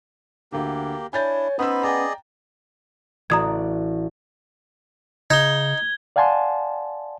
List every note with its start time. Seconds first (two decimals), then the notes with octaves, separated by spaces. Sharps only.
0.52 D2 D3 A#3 G4
1.13 D4 E4 C#5 G#5 G6 A6
1.59 B3 C#4 D#4 C5 B5 D#6 E6
1.83 G#4 D5 D#5 G5 A#5
3.30 A1 F#4 D5 A#5 D#6 G#6
5.30 C#3 D#4 G#6 G7
6.16 D5 F5 F#5 G#5 A5 C6